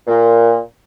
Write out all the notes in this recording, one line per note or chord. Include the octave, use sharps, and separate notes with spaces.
A#2